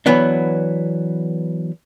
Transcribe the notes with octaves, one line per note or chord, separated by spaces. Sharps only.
E3 F#3 B3 D4